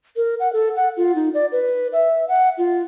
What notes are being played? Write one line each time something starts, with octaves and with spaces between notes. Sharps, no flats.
A#4
F#5
A4
F#5
F4
D#4
D5
B4
E5
F#5
F4